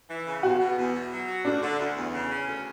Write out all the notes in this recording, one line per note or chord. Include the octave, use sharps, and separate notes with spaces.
E3
C#3
E2 F#4
B2
E2
B2
F#3
F#4
D2 D4
D3
D2
E2
C#3
C#4
D2